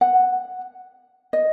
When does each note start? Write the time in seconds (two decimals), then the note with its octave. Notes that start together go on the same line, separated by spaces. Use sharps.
0.01 F#5
1.33 D#5